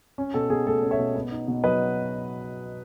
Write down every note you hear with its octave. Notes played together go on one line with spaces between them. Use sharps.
C#4
B2 A4
B2 G#4
A3 A4
C#4
C#5 E5
B2
B3
D#4
B2
F#3 B4 D#5